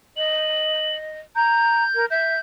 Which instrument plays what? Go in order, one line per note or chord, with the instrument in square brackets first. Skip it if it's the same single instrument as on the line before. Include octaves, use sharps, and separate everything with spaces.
[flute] D#5 [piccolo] F#7
[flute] A#5 [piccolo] G6
[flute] A#4
[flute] E5 [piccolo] G6